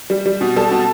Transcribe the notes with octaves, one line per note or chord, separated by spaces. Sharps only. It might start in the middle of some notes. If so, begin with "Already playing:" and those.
G3
G3
B2
G3 A4 A5
B2